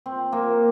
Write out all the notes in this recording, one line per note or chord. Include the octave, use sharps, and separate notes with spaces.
C4
A#3